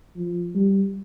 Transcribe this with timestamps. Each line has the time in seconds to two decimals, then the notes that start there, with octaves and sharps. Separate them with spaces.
0.16 F3
0.55 G3